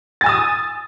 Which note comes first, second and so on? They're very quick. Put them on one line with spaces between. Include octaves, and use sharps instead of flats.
A6 G#5 E6 D#6